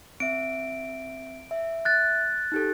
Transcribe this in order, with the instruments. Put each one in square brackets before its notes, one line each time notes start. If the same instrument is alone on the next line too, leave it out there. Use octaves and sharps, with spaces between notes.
[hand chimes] C4 E5 [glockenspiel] D7
[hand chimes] E5
[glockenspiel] F#6 A6
[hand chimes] D#4 G4 A4